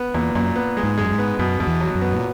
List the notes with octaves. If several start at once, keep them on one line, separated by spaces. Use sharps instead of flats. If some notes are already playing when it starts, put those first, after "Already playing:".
Already playing: B3
E2 A#2
F#2 A#2
B3
G#3
G#2
F#2 G#3
G#2
B3
F#2 B2
F#2 B2
E2
F#3
F#2
B3
A#2